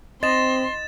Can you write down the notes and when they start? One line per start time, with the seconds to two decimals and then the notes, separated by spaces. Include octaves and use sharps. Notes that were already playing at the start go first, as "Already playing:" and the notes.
0.23 C4 D#5 C6 A6 E7